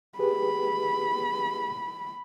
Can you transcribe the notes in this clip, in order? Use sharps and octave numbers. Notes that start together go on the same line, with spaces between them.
G4 G#4 B4 B5